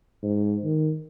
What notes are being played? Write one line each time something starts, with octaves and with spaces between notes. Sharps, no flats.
G#2
D#3